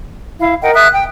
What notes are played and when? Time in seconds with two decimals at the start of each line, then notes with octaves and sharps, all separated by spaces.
0.40 E4 F5
0.62 A#4 D#5 F#5 G5
0.74 E5 D#6 F#6
0.93 G5